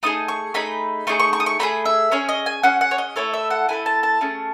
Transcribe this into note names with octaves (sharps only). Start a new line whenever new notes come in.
A3 D#4 G#4 D#6
C#6
A3 D#4 G#4 B5
A3 D#4 G#4 C#6
C#6
C#6
D#6
C#6
A3 D#4 G#4 B5
E5
C#4 G#4 C#5
D#5
G#5
C#4 G#4 F#5
F#5
C#5
D#5
A3 E4 A4 C#5
E5
F#5
A3 E4 A4 G#5
A5
A5
A3 C#4 G#4